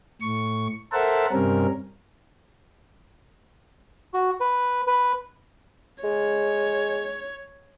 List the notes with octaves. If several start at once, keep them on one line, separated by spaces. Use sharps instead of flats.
A2 C#6
A4 A#4 C5 E5 F#5 A5
G2 C3 G3 C4 C#4 A#4
F#4
B4
B4
G#3 C#5